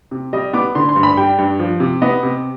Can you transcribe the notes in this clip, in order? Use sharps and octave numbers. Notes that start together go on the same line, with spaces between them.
C3
G3 D#5
B3 D6
D3 C6
C6
G2
B5
G3 G5
G2
F3
C3
B3 D#5
C3